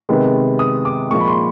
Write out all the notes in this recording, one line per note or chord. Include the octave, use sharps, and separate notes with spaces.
C3 D#3 G#3 B3
D#6
D6
A#2 F3 G#3 C#6
B5
C6